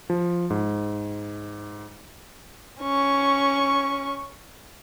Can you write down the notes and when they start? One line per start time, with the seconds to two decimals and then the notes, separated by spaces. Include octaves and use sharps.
0.10 F3
0.50 G#2
2.82 C#4 C#6